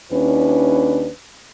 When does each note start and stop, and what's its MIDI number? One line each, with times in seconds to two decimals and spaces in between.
0.11 1.09 39
0.11 1.09 61
0.11 1.09 62
0.11 1.09 64
0.11 1.09 71